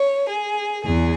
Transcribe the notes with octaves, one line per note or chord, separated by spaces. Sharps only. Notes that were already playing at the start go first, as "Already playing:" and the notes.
Already playing: C#5
G#4
E2 G#4